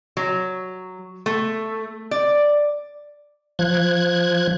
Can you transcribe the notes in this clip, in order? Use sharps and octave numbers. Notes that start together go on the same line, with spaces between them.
F#3
A3
D5
F3 F#6 G#6